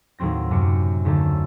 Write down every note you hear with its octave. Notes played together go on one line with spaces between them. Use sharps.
D#2 A2 F#3 C4 A#6
F#2 C3 D6 C#7
D#2 D3 A3 A5